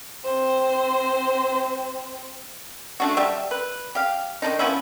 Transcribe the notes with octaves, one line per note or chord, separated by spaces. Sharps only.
C4 C5
A3 D4 F#4
G3 G4 E5
B4
G4 F5
D#3 F#3 D4 D#4
F3 B3 C#4 E4